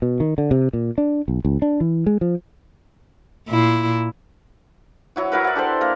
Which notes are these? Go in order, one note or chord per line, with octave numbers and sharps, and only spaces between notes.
B2
D#3
D3
C3
A#2
D4
B1
C#2
D4
E3
G#3
F3
A#2 E4
F#3 E4 F#4
E4 F#4 A#4 B4
D5 F#5
D4 G4 A4 C5
A#3 A#4